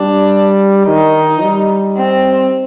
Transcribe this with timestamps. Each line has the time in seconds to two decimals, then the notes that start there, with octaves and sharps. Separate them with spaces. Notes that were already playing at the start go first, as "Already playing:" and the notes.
Already playing: G3 D4
0.86 D#3 D#4
1.43 G3
1.97 C4